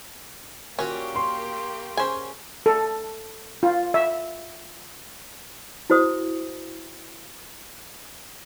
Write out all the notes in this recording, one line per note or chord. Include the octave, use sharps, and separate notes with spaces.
A#2 A#3 C#4 F#4 G4
C6 C#6
C#4 G#4 C5 G#5
A4
F4
E5
E4 F#4 C5 D#6